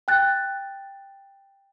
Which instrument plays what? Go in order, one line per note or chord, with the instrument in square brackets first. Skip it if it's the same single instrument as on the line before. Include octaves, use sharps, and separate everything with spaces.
[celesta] G5 F#6 A6